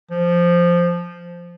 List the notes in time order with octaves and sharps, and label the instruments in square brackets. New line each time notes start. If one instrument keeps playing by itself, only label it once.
[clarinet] F3